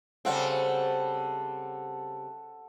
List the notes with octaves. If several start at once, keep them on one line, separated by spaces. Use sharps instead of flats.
C#3 G3 C4 A4 F#5 A5